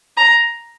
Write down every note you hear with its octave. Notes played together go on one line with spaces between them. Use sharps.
A#5